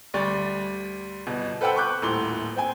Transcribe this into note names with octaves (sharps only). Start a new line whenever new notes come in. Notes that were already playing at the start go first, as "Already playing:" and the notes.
D2 G3 D5 C#6 A6
G1 B2
A4 B4 C5 F#5 G5 E6
C#6 D6 F#6 G6
D#1 A2 C6 G7
C4 G5 G#5